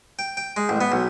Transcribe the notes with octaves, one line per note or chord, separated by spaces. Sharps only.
G5
G5
G#3
A1
B3
B1